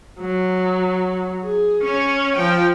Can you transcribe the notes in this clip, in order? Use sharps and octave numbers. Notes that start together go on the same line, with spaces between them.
F#3
G#4
C#4 C#5
F3 G5